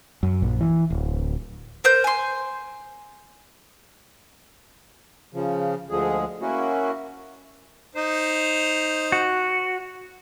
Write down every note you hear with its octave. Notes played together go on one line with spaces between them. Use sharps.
F#2
A#1
E3
D1
A#4 C5 G6
G#5 C6
C#3 F3
D2 D3 F3 G#3 G#4
A#3 C#4 E4 F#4
D#4 C5
F#4